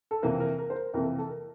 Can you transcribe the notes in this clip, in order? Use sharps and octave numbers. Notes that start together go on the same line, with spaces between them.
A4
F2 C3 E3 A#3 A#4
A#4
A#4
C5
A#4
F2 C3 E3 A#3 A#4
A4
A4
A#4